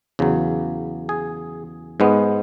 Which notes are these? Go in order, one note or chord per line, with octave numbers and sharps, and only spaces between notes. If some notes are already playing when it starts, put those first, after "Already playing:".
E2 C#3 F#3
G#4
G#2 G#3 B3